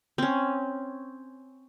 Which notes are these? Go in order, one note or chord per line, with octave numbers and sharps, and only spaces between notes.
C4 C#4